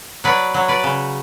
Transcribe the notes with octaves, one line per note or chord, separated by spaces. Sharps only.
F#3 B4 D5
F#3
B4 D5
C#3